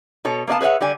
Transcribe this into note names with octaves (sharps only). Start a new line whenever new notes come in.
B2 A4 C#5
A#3 B3 D5 F5 A5
G#4 B4 C#5 E5 F#5
D3 G3 D5 G#5